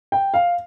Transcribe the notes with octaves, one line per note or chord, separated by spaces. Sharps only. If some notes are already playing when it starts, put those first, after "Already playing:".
G5
F5